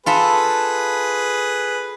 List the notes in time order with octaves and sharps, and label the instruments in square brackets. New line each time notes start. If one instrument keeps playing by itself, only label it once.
[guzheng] F4 A4 E5 [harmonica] G#4 B4